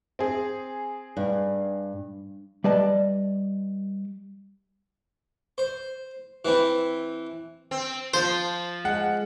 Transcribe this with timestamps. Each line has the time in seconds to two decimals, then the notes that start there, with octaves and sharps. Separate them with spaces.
0.19 C4 G#4
1.17 G2
2.64 G3 B4 D5 D#5 A5
5.58 C5
6.45 E3 C4 E4
7.71 C4
8.14 F3 C5
8.85 G#3 F#5